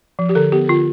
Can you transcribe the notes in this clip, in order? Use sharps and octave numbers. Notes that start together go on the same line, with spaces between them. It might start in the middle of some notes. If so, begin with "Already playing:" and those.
F3
G4
D3 A4
B3 G4
D3 F4